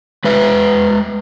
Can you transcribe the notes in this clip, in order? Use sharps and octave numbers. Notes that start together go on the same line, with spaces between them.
G#3 B4 E5